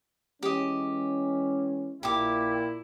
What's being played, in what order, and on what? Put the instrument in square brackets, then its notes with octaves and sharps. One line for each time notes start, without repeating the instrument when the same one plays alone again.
[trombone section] E3 G#3 C#4 [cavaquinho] G4 D#5
[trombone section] A#1 [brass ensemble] A#2 E4 [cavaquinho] G4 D6